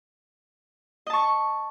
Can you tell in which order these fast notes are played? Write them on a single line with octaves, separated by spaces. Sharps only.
D#5 A5 C#6